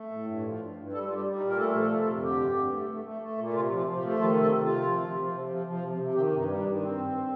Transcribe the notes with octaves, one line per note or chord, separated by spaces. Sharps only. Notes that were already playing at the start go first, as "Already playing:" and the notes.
Already playing: A3
A2
G2
F3
G2
G2
G3 A4
G3 F4
G4
G3
D#4
A#2
A#4
A3 A4
F3
A4
C3
A4
F2
D3 G4
G2
G2
A3
A3
A3
A3
A#2
C3 F4
F3
F4
F3
G4
A3
D#3 F4
C3 A4
C3
C3 F4
F3
C3
F3
C3
F3
F3
C3
C3
D#3 G4
G2
D#4
G3
D4
D#3
G2 C4
G2